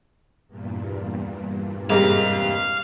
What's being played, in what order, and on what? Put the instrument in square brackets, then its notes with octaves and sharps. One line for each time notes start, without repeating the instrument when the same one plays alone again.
[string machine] E2 G2 A#2
[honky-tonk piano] G#2 C3 G3 [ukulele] G#4 A#4 [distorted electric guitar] F5